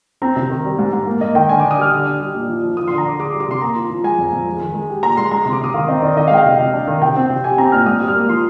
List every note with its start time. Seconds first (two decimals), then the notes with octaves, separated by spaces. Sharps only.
0.22 C4 A#5
0.36 C3
0.50 D#3
0.65 G3
0.79 G#2
0.93 G#2
1.07 A#3
1.21 A#3 D#5
1.35 D#3 G5
1.49 D3 G#5
1.60 D4 D6
1.71 D#6
1.78 G3 F6
1.92 D3
2.06 D4
2.19 G3
2.35 A#2
2.49 F3
2.63 F3
2.77 F3 D#6
2.88 D3 C6
2.98 A#5
3.05 D3 D6
3.19 G#4 D6
3.34 G3
3.40 D6
3.48 C3 C6
3.61 A#3 A#5
3.75 F3
3.90 F3
4.04 G#3 G#5
4.18 F2
4.33 F2
4.47 G#3
4.61 D#3
4.75 G#3
4.90 G4
5.03 A#2 A#5
5.17 G#3 C6
5.31 G#3 A#5
5.43 C3 C6
5.53 D6
5.60 C3 D#6
5.74 D#3 F5
5.88 C4 D#5
6.02 D#3 D5
6.16 D#3 D#5
6.27 F5
6.30 G#3 G5
6.38 F5
6.45 C3 D#5
6.59 C3
6.74 D4
6.87 D#3
7.02 C3 G5
7.16 C4
7.30 C3
7.44 G4 G#5
7.58 C4 A#5
7.72 A#2 F6
7.86 G#2 D#6
8.01 G3
8.08 F6
8.15 A#3
8.29 F3 C6